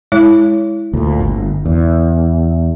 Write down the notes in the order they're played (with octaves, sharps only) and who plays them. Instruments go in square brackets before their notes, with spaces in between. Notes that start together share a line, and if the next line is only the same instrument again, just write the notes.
[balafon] G#3 E4 C#5
[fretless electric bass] D2 A#2
G1
E2